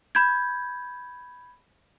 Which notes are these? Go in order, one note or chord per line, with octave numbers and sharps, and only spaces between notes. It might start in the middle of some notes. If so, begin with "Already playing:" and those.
B5 G6 G#6